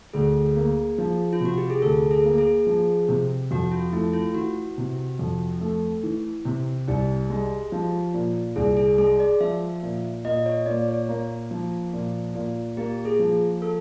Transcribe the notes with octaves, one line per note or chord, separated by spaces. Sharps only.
D2 G#4
A#3
F3
F4
C3 F#4
G4
G#4
D2 A4
G#4
A#3
G#4
F3
C3
F2 F#4
F4
A3 E4
F4
E3 F#4
C3
F2
A3
E3
C3
C2 G4
G#3
F3
A#2
C2 G#4
G#4
G#3 G#4
D5
F3 E5
A#2
A#2 D#5
C#5
A#2 D5
C#5
A#3
F3
A#2
A#2
A#3 G4
G#4
F3
A4